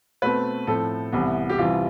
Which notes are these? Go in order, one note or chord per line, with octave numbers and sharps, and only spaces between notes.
B2 A3 C4 B4
A2 F3 C4 A4
C2 C3 E3 B3
G4
C2 C3 E3 G3 F4